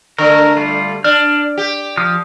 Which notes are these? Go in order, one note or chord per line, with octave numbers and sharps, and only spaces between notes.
D3 A3 A#4
G3 F4
D4 F6
G4
F3 D#6 F6